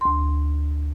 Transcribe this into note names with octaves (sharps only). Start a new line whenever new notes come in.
D2 C6